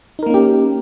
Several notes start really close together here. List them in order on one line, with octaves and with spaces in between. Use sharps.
D#4 A#4 A#3 C#4 G4